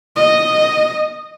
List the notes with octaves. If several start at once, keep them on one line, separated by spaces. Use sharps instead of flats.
D#5